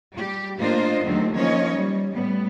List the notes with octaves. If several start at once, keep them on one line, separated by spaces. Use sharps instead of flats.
G3 G4
A2 A#3 D4 F4 C5 D#5
D#2 D3 D#3 F#3 A3 C4
D#3 F3 A#3 C#4 C#5 D#5
G3
A2 G3 B3